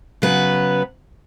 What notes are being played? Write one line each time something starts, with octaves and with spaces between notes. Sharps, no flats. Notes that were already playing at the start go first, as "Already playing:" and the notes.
C#3 F#3 B3 B4